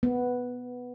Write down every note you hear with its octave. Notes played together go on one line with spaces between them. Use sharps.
B3